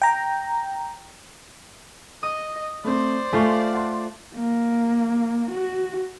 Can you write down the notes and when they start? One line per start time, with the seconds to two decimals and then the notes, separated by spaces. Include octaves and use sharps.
0.02 G5 A#5
2.23 D#5 D#6
2.85 A3 C4 C5 D5
3.33 A3 F4 G#5 C#6
3.73 F#5 A5 C6
4.35 A#3
5.51 F#4